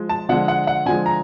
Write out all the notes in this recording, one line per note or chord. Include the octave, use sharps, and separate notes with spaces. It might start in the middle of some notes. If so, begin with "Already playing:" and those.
Already playing: F3 G#3
A5
D3 F3 G#3 F#5
F#5
F#5
D3 F3 G#3 G#5
A#5